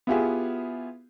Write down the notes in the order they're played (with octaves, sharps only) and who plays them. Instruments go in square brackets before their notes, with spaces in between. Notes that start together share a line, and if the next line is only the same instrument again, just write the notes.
[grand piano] B3 E4 F4 G4 G#4 E5